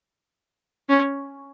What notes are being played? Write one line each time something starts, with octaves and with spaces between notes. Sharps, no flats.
C#4